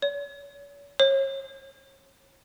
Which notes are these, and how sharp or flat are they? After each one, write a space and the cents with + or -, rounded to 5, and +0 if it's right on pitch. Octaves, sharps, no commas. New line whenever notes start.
C#5 +40
C#5 -35